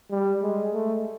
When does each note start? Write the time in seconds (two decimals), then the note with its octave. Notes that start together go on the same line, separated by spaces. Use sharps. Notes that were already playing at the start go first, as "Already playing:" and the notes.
0.11 G3
0.43 G#3
0.74 A3